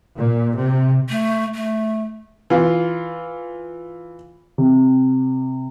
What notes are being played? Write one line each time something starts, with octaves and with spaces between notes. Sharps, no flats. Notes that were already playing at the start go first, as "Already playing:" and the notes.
A#2
C3
A3
A3
E3 F4
C3